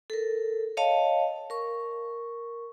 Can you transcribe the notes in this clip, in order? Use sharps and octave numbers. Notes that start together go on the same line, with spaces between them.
A4 A#4
C#5 D#5 F5 A5
A#4 C#6